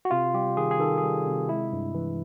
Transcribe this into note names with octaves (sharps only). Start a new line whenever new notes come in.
F#4
C3 F4
G3 G4
D#3 G#4
G#4
D#3 A4
G#4
G3
C3
G#3 E4
G2
E3